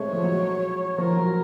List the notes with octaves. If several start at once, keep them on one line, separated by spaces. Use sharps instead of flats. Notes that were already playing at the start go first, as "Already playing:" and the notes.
Already playing: G#3 A3 C4 C#5
F3
F#3
F3 A#4
F#3